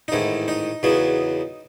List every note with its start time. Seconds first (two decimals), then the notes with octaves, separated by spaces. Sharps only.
0.08 D#4
0.12 A1 G#2 D#3 E4
0.48 D#4
0.83 E2 C#3 F#3 B3